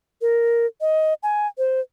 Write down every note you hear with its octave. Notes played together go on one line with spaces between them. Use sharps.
A#4
D#5
G#5
C5